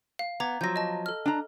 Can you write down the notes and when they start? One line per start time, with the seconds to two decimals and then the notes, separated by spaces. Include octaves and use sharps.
0.19 F5
0.40 B3 A#5 D6 G#6
0.61 F3 F#3 G6 A#6
0.76 D#5 A5
1.06 A4 F6
1.26 D4 A#5